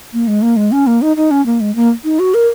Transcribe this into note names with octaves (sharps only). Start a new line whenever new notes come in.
A#3
G#3
A#3
G#3
C#4
A#3
D#4
D#4
C#4
A#3
G#3
A#3
D#4
F#4
A#4